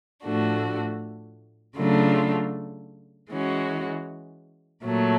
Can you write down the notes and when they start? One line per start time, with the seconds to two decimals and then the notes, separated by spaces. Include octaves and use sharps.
0.24 A2 F3 A3 D4 F#4
1.77 C#3 F#3 A3 D4 F4
3.31 E3 G#3 C#4 F#4
4.84 A#2 F#3 A3